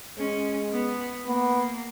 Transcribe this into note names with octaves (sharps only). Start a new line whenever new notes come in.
G#3 C#4
B3
A#3 B3